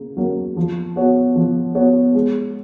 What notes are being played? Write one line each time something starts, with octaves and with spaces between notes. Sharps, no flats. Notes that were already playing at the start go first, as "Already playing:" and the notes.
Already playing: C#3 A#3
F#3 A#3 C#4
F3
B3 F#4 C#5
F3
B3 F#4 C#5
G#3